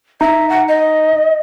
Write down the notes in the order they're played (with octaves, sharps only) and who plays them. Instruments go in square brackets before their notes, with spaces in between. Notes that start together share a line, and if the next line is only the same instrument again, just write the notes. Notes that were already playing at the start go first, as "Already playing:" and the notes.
[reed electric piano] D#4 A#5 [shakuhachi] E5
[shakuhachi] F#5
D#5